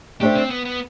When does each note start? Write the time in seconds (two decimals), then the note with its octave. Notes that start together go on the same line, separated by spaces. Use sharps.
0.21 A3 D4 G4 A4 C5 E5
0.35 C4
0.50 B3
0.65 B3